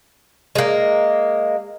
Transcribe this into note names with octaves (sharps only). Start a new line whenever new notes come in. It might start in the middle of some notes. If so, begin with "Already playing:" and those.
G#3 A#3